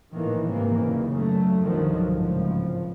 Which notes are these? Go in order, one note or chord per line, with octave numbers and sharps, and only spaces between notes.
A#1 A2 D#3 E3 A#3
G#1 G#2 C3 E3 A#3
F#1 D#2 C#3
F#2 F#3 A3
C2 G2 D3 D#3 F3 F#3
G#1 C#2 A2 F3